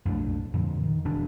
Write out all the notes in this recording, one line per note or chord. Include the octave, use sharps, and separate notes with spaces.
B1 F2 A3 D4
F2 A#2 D3 F3
D#3
E1 D4